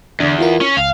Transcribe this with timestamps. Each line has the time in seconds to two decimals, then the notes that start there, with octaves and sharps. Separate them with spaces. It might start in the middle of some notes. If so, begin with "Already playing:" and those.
0.20 E2 D3 D4
0.38 E4 F4 A#4
0.62 C#4
0.77 C#2 F5